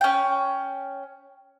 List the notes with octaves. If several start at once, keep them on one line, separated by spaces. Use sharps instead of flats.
C#4 G5